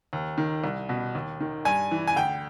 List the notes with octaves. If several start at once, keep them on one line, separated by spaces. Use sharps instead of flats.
D#2
D#3
C2
B2
D#2
D#3
G2 G#5
E3
G#5
D2 G5